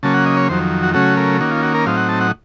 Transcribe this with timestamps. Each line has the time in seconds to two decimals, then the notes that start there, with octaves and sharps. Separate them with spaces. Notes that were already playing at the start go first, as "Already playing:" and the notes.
0.03 C#3 F#3 A#3 C#4 A5
0.14 F#5
0.26 D#5
0.37 C#5
0.49 F2 D#3 F#3 C5
0.83 F#4
0.94 C#3 F#3 A3 C#4 F#4
1.17 A#4
1.40 D#3 A#3 C#4 F#4
1.51 F4
1.63 F#4
1.75 A#4
1.86 A2 F#3 C4 D#4 F5
1.97 F#5
2.09 A5
2.21 F#5